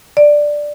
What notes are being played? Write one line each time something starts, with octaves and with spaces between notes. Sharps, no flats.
D5